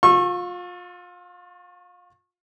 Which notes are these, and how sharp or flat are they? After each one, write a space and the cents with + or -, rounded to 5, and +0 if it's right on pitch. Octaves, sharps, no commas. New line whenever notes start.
F4 +30 C#6 -30 E6 +20